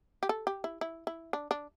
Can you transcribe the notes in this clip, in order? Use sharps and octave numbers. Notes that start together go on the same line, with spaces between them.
G4
A4
G4
E4
E4
E4
D4
D4